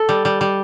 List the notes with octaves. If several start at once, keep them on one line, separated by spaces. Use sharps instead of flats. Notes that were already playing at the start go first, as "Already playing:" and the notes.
Already playing: A4
G3
G3
G3